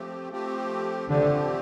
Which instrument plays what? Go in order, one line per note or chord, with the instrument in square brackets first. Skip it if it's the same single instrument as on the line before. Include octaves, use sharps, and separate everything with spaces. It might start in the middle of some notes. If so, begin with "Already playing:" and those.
Already playing: [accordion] F3 A3 C4 G4
F3 A3 C4 G4
[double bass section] D3 [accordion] F3 A3 C4 G4